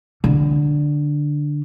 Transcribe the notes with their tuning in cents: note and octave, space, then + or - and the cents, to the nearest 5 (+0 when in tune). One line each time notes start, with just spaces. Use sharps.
D3 +5